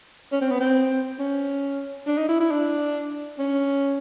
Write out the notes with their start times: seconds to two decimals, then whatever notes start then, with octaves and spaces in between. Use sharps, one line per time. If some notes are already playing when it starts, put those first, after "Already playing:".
0.32 C#4
0.42 C4
0.51 B3
0.60 C4
1.19 C#4
2.07 D4
2.18 D#4
2.29 E4
2.41 E4
2.51 D4
3.39 C#4